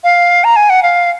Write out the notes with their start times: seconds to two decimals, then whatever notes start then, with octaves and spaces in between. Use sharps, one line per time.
0.04 F5
0.44 A#5
0.56 G#5
0.70 F#5
0.83 F5